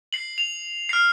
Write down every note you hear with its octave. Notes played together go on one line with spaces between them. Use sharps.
C7 F#7
F7
F6 C7